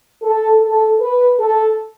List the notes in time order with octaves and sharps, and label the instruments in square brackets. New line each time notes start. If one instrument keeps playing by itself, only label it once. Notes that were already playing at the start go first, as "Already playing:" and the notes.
[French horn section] A4
A4
B4
A4